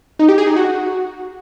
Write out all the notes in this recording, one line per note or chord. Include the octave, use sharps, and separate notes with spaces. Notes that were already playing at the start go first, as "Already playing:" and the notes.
D#4
G4
G#4
D#4
F#4